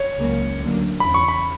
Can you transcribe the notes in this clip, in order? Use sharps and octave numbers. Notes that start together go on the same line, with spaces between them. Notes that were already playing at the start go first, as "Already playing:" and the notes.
Already playing: C#5
C#2 C#3 F#3 A#3
D2 D3 F#3 A#3
E2 C#3 E3 B5
C#6
B5